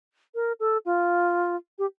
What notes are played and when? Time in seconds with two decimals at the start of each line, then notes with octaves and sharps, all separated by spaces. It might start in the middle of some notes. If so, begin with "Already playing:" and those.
0.35 A#4
0.60 A4
0.85 F4
1.79 G4